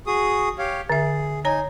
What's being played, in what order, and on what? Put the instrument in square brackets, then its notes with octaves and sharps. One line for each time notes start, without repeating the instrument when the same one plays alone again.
[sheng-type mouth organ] F#4 G#4 D#6
G4 C#5 F5
[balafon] D3 E5 [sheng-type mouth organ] G#4
[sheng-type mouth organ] D#4 G#5 [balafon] C#5 A#5